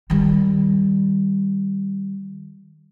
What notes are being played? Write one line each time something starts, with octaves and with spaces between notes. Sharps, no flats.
D#3 G3